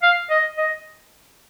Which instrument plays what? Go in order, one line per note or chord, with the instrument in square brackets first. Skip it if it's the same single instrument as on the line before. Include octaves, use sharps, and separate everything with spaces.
[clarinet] F5
D#5
D#5